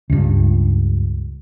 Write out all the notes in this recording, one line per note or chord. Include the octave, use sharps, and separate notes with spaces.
C#2 G2